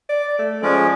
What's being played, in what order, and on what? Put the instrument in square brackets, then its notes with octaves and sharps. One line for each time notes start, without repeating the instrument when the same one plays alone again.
[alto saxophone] D5
A3
[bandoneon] F3 G#3 C#4 [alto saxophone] D5